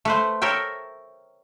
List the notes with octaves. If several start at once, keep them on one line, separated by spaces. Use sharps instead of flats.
A3 B4 C5
A4 A#4 C#5 E5 G5